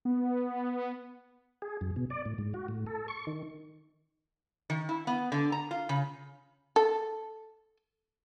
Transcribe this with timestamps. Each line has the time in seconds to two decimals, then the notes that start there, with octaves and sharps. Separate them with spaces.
0.05 B3
1.62 G#4
1.81 F#2
1.96 B2
2.10 D5
2.25 A2
2.38 G#2
2.54 F#4
2.68 A2
2.86 A4
3.08 C#6
3.27 D#3
4.70 D#3
4.89 E4
5.07 B3
5.32 D3
5.52 A#5
5.71 F4
5.89 C#3
6.76 A4